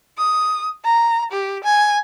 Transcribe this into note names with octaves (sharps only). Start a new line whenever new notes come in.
D#6
A#5
G4
G#5